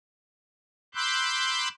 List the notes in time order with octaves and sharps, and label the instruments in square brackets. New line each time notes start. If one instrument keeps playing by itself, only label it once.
[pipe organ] B5 C6 D6 E6 F#6 G6